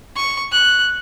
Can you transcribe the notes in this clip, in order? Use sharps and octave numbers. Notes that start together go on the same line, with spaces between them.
C#6
F#6